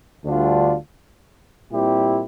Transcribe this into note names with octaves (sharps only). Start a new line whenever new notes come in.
D2 D3 G3 D4 F4
A#2 G3 C4 E4 G4